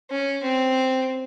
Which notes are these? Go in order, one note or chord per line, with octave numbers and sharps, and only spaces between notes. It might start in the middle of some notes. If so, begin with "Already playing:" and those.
C#4
C4